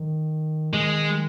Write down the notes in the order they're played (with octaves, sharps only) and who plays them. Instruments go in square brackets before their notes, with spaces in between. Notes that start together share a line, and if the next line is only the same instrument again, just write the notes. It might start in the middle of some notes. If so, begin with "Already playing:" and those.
Already playing: [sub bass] D#3
[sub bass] D#3 [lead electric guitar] G#3